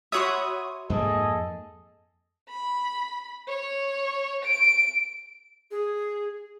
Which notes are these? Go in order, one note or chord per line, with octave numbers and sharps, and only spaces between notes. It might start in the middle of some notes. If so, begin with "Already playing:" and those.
F#4 C#5 E5 B5 C6 D#6
F2 G#2 A#3 G#4 A4 D#5
B5
C#5
D7
G#4